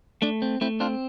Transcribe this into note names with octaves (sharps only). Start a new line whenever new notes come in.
A3 D4
C4
A3 C4 E4
C4 D4 F4